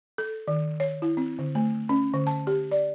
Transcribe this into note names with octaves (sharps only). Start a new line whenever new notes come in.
A4
D#3
C#5
E4
C4
D3
A3
C#4
D3
A5
G4
D5